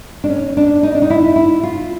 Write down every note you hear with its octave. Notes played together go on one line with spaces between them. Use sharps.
D4
C#4
D4
D#4
D4
D#4
E4
E4
F4